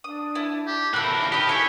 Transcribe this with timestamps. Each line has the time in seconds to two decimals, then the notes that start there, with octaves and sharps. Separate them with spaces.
0.04 D4 D#6
0.35 E4 A5
0.67 G4
0.94 A2 C#3 A#4 A5 B5 E6 F#6
1.32 D#4 G4 D#6
1.49 C#4 E4 A4 C#5